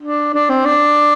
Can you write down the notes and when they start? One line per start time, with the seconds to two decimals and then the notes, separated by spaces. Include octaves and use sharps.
0.02 D4
0.34 D4
0.50 C4
0.65 D4